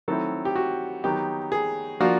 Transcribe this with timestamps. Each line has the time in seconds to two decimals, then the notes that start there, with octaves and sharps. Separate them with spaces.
0.08 D#3 F#3 A3 C4 E4 A4
0.45 G4
0.56 F#4
1.04 D#3 F#3 B3 D#4 G4
1.52 G#4
2.00 F3 A#3 D4 F4 F#4